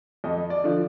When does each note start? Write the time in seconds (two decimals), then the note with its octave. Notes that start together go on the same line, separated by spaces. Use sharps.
0.24 F2 D#5
0.50 D5
0.64 D3 F3